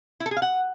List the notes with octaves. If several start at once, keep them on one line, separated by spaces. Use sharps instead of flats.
E4
A4
G#4
F5
F#5